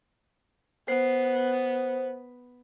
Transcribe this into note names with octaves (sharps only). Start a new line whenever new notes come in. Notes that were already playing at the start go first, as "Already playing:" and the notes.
B3 C5